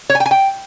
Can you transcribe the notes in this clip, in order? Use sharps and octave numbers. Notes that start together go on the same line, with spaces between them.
C#5
G#5
G5
G#5
G5